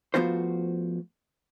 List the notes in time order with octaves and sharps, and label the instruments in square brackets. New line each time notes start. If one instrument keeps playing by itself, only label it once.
[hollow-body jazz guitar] F3 A3 B3 F4 F#4 C5